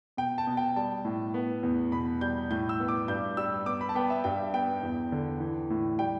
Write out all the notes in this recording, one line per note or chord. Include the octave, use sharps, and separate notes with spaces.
B2 G5
A5
B2
G5
G3 A5
A2
B3
E2
B2 B5
G3 G6
A2 G6
E6
B3
D6
G2 G6
G3 E6
B3 D6
B5
A5
B3 G5
E5
G2 G5
B3 G5
E2
D3
E3
A2
G3 G5